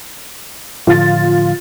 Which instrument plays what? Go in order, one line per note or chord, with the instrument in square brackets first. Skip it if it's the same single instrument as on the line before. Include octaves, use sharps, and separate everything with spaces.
[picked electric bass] A2 D3 F3 [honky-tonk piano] F4 A6